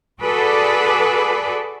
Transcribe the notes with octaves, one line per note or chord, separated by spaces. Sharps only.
F#4 G#4 A4 B4 D5